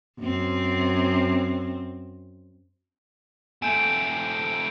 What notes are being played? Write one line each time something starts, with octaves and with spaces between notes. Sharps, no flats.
F#2 C4
A3 C4 G#5 G6 D7